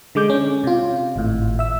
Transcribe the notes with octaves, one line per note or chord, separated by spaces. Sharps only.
D3 G#3 D6 G6
C#4
C3 F4
G#1 A2
E5 E6